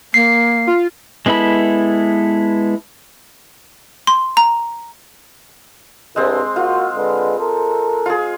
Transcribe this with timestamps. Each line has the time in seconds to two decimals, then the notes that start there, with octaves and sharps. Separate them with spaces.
0.14 A#3 C7
0.67 F4
1.26 G#3 B3 E4 A4 B5
4.07 C6
4.37 A#5
6.16 C2 G2 G#3 C4
6.56 A#3 F4 F#4
6.96 D3 G#3 B4
7.40 A4 A#4
8.06 F4 G#4